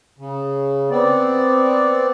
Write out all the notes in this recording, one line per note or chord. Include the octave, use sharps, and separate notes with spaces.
C#3
B3 C4 D5